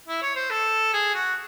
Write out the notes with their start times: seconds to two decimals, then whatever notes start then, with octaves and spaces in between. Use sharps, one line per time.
0.08 E4
0.22 C#5
0.36 C5
0.50 A4
0.93 G#4
1.14 F#4